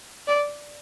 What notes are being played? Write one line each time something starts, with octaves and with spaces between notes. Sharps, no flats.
D5